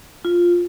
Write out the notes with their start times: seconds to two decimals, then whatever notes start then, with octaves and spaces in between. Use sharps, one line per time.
0.25 F4